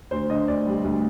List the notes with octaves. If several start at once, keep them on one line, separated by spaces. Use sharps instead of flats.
D2 C5
D3 D#5
D2 D5
G3
D2